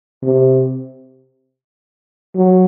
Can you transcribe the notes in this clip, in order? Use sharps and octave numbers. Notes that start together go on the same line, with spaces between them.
C3
F#3